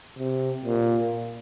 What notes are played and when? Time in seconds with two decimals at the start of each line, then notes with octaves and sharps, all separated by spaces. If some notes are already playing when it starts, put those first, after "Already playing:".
0.18 C3
0.65 A#2